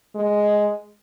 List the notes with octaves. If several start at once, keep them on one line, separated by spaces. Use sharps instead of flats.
G#3